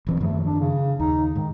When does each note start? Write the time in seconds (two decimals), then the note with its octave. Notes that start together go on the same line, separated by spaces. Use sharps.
0.07 D#1 E3 C4
0.20 F#2 D#3 F3 A3
0.46 D4
0.60 C#3
1.00 D#2 D#4
1.35 G#2 D#3